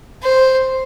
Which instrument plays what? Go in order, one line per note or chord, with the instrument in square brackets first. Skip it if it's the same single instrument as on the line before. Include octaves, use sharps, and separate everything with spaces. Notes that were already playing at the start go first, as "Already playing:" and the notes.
[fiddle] C5